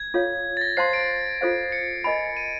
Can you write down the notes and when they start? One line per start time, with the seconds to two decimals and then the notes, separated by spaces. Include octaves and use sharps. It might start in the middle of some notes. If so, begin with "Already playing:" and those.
Already playing: G#6
0.14 F4 A4 C#5 F5
0.57 A6
0.61 A#6
0.77 C5 F5 A5 C6 C7
0.93 D7
1.41 F4 A4 C5 F5
1.72 C#7
2.04 A#4 D#5 G#5 B5 D7
2.37 D#7